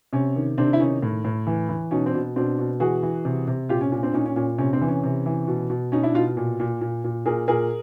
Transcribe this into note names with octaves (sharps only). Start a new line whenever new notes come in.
C3 C#4
D#3
C3 C4 D4
E4
D#3 C#4 D#4
A2
A2
E3
E3
B2 C#4 D#4
C4 D4
B2
B2 C4 D4
B2
E3 F#4 G#4
E3
C3
C3
A#2 F4 G4
C#4
A#2 C#4
C4 D4
A#2 C#4 D#4
C#4
A#2 C#4
C3 C#4
C4 D4
E3
C#4
C3
E3
B2
B2
B2 C#4 D#4
D4 E4
B2 D#4 F4
A#2
A#2
A#2
A#2
A#2 G#4 A#4
A#2 G#4 A#4